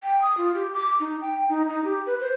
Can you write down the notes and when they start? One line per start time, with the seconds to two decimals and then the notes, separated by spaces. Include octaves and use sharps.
0.03 G5
0.22 D#6
0.37 F4
0.55 G4
0.74 D6
1.00 D#4
1.22 G5
1.49 D#4
1.68 D#4
1.84 G4
2.07 B4
2.21 C5